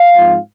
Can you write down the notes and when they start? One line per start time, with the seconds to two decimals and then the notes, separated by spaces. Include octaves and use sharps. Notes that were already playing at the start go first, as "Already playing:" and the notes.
Already playing: F5
0.16 G#2 F3 C4 F4